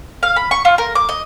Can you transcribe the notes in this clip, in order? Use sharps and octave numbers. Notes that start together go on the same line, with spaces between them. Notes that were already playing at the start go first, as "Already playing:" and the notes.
F5
B5
C#6
F4
A#4
D6
D#5